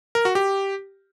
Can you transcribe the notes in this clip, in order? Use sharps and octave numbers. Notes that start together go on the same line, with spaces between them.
A#4
F#4
G4